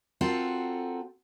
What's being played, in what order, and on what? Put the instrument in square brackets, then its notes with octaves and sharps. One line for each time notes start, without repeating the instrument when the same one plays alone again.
[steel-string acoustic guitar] C4 F4 F#4 A4 A#4